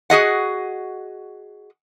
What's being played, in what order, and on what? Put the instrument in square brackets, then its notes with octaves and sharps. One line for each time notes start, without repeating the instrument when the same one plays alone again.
[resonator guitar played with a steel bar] F#4 G#4 D#5 F#5